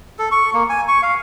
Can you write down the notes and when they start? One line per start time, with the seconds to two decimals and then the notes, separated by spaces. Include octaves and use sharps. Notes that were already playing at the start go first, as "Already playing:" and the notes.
0.19 A4
0.32 C#6
0.53 A#3
0.70 G#5
0.88 C#6
1.03 F5